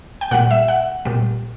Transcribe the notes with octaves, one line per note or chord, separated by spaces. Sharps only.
G5
A#2 G3 F#5
E5
F#5
A#2 G3